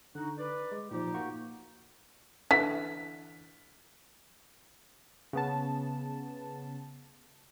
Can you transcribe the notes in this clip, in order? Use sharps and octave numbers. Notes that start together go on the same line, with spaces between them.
D3 D#4 F#4
B4 D5
G#3
A#2 F3 D#4 G4
A#3 F#4 C#6
D3 E3 B6
C#3 B3 A5